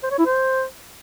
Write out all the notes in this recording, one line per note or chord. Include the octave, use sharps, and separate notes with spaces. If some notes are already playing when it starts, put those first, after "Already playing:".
C5
C#5
E4
C5